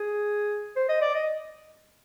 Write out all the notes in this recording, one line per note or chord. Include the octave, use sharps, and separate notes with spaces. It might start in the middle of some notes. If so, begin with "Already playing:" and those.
Already playing: G#4
C5
D#5
D5
D#5